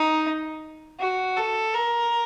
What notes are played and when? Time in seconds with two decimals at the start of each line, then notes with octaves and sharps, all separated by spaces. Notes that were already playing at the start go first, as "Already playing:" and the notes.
Already playing: D#4
1.00 F#4
1.37 A4
1.74 A#4